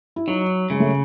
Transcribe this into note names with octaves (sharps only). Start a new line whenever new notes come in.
E4
F#3 D#4
C#3 G#3
A3